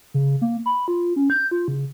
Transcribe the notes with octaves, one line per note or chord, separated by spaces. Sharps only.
C#3
A#3
B5
F4
C#4
G6
F4
C#3